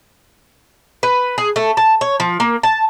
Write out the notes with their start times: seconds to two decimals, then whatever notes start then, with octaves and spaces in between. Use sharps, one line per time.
1.03 B4
1.38 G#4
1.56 A3
1.77 A5
2.01 C#5
2.20 F3
2.40 A#3
2.63 A5